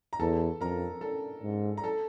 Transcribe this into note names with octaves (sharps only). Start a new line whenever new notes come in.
A#5
E2 A4 A5
F2 A#4 A#5
A4 A5
G#2
A#5
A4 A5